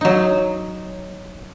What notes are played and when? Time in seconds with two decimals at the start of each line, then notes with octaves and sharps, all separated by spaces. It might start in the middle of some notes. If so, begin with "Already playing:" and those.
0.01 F#3 D#4